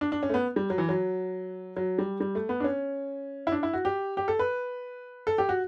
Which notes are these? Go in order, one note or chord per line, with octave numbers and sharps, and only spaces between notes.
D4
D4
C#4
A3
B3
G3
F#3
E3
F#3
F#3
G3
G3
A3
B3
D4
C#4
E4
D4
E4
F#4
G4
G4
A4
B4
A4
G4
F#4